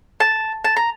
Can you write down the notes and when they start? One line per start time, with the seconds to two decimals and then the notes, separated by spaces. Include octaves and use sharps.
0.20 A5
0.65 A5
0.76 A#5